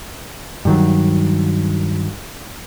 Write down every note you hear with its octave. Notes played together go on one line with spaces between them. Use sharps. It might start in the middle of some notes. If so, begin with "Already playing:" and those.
G2 D#3 F#3